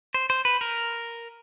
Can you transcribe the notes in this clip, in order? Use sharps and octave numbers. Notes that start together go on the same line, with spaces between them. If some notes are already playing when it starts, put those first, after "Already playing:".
C5
C5
B4
A#4